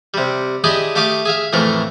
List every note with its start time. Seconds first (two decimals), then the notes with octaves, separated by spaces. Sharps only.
0.14 C3 G3
0.64 D4 E4 G4 G#4 D#5 C6
0.95 A3 G4 F5 D6 D#6
1.25 G#4 E5 F5
1.53 F2 A2 E3 A3 A#4